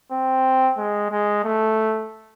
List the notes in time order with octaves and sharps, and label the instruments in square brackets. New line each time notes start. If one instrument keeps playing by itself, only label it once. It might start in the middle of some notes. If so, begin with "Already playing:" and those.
[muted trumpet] C4
G#3
G#3
A3